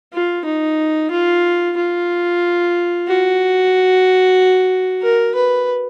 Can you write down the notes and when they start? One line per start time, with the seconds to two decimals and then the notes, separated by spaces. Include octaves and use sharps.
0.14 F4
0.45 D#4
1.11 F4
1.77 F4
3.07 F#4
5.03 A#4
5.35 B4